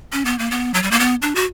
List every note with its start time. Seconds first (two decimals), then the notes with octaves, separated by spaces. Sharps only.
0.12 C#4
0.25 B3
0.39 A#3
0.51 B3
0.74 F#3
0.83 G3
0.91 A#3
1.00 B3
1.22 D4
1.35 F#4